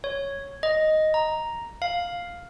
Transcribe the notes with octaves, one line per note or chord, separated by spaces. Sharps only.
C#5
D#5
A#5
F5